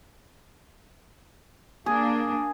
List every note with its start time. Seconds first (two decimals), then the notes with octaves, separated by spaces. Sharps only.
1.86 A#3 D4 G#4